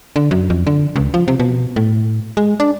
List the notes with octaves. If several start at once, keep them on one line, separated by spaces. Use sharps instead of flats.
D3
F#2
F2
D3
C#2
F3
C3
B2
A2
G#3
D4